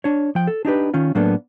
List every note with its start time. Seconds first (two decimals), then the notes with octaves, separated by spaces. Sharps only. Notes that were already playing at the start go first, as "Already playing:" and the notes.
0.04 D4 C#5
0.35 F3 G5
0.47 A4
0.65 D4 D#4 G4 B4
0.94 D#3 C#4 F4
1.15 A2 F#3 A#3 B3 D4 A4